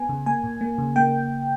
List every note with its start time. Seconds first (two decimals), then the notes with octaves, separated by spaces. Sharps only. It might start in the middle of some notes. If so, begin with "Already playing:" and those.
Already playing: B3 G#5
0.09 C#3
0.26 A#3 G#5
0.44 A#2
0.61 A#3
0.78 C#3
0.96 A#3 G5